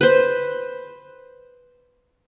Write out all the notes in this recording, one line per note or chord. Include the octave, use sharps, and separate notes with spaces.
B4 C5